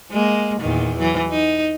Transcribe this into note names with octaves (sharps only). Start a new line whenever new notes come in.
G#3 A#3
E2 A#2 D#3
E3 F#3
D#4